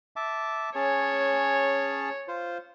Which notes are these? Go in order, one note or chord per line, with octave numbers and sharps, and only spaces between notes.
E5 A5 D6
C#4 G#4 C#5 A5
F4 C5